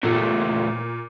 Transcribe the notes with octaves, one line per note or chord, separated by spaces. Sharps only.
E2 A#2 A3